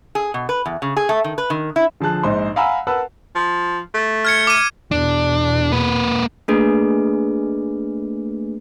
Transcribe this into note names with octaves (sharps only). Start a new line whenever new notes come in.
G#4
B2
B4
E2
C#3
G#4
A3
D#3
B4
D#3
E4
D3 F3 G#4 A5 F#6
A#1 G#2 D#4 C5 C6
F5 F#5 G#5 A#5 B5 E6
A#4 B4 F#5 A5 E6
F3
A3
F6 G#6 C#7
D6 D#7
E2 B2 D4
A#3 B4
A3 A#3 D4 G#4 B4